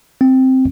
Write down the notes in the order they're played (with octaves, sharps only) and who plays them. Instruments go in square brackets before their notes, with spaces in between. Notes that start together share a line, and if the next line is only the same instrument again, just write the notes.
[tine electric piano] C4